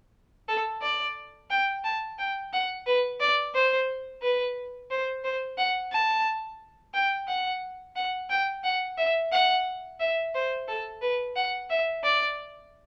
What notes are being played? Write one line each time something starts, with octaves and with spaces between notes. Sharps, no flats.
A4
D5
G5
A5
G5
F#5
B4
D5
C5
B4
C5
C5
F#5
A5
G5
F#5
F#5
G5
F#5
E5
F#5
E5
C5
A4
B4
F#5
E5
D5